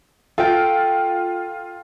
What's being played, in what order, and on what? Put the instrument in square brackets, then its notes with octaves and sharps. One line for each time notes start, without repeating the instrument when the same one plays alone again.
[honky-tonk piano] F4 [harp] A4 G5